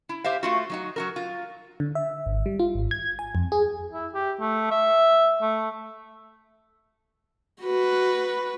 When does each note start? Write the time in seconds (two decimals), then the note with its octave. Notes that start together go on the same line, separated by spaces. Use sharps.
0.09 E4
0.24 G4 C5 E5 F5
0.43 A3 F4 F#4
0.70 F#3 D#4 F#4
0.96 F#3 F#4 A#4
1.16 F4
1.80 D3
1.95 E5
2.26 G#1
2.46 G3
2.60 F4
2.75 G#1
2.91 G#6
3.19 G#5
3.35 F2
3.52 G#4
3.92 E4
4.14 G4
4.40 A3
4.71 E5
5.42 A3
7.62 F#4 B4